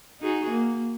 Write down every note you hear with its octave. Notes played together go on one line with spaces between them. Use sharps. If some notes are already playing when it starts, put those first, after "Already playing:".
D#4 F#4 G#4
A#3